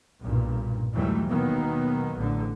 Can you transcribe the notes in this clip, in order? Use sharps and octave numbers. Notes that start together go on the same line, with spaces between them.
B1 G2 A#2
D#2 E3 F#3 G3 A3
B2 D#3 F#3 A#3 B3
A1 D3